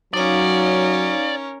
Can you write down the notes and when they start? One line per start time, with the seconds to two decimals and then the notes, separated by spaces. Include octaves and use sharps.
0.13 F#3 C#4 D#4 A#4 D5 F5